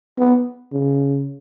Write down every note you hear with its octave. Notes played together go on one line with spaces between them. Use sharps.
B3
C#3